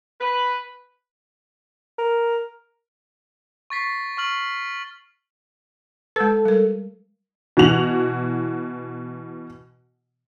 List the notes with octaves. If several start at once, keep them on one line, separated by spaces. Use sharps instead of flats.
B4
A#4
C#6 A6 B6 C7
C#6 F6 F#7
G#3 A4 B4
G3 A#4
B2 E3 F#4 F7 F#7